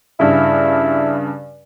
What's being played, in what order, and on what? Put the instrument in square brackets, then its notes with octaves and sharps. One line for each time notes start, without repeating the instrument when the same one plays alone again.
[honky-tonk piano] G2 C#3 [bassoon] E4